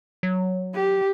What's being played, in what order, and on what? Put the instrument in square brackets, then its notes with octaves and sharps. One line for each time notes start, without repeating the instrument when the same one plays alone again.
[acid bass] F#3
[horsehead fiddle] G4